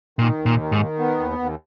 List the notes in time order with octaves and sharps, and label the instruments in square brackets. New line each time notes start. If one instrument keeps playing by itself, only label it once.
[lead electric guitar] A#2 [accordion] D#3
[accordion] D#2
[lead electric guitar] A#2
[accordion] D#3
[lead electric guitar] G#2
[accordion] D#3
B3
D#2
D#2